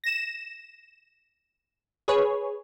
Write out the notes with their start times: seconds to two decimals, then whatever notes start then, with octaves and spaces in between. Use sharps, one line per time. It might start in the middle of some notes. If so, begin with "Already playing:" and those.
0.04 A#6 E7
2.08 G#4 B4 C#5